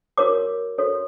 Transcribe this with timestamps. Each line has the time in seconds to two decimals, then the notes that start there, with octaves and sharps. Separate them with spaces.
0.18 F#4 A#4 C#5 D6
0.78 F#4 A4 C#5